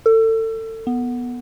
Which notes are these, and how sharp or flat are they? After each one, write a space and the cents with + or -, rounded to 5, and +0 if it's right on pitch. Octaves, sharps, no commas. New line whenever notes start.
A4 +30
B3 -10